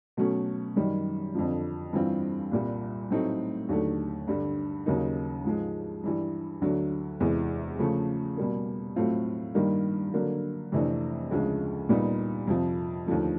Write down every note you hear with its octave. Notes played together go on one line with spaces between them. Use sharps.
B2 F#3 A3 C#4
F#2 D#3 G3
F2 D3 F3
G2 E3 G3 C4 F4
C2 A#2 G3
A2 F#3 A3 C4 D#4
D#2 D3 F#3 A3
G2 D3 G3
D#2 C#3 F#3 A#3 D#4
G#2 F3 G#3
G2 E3 G3
D2 D3 F#3
E2 C3 E3 G#3
C#3 F3 A3
B2 G3 A#3
A2 F#3 A3 C4 F4
G2 D#3 G3 A#3
D3 F#3 A#3
F2 C3 E3 A3 D4
D2 C#3 F3 G#3 C#4
A#2 G3 B3 D#4
F2 C3 F3
D#2 D3 F3 A3